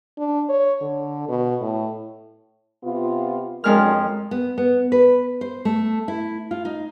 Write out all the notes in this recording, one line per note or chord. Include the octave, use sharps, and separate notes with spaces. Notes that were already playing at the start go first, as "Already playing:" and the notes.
D4
C#5
D3
B2
A2
C3 B3 F4
F2 F#3 G#3 D4 A#4 F6
B3
B3
B4
C5
A3
E4
F4
D#4